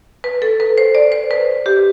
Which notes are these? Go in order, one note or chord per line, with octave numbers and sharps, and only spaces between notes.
B4
A4
B4
C5
D5
C5
B4
G4